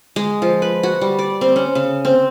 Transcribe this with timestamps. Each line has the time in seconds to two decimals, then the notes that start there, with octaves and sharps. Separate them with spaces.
0.16 G#3
0.42 F3
0.62 B4
0.83 F#4
1.01 G3
1.19 D5
1.41 C4
1.56 C#4
1.75 C#3
2.05 C4